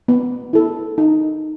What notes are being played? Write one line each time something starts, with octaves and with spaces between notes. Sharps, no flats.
B3
E4 A4
D#4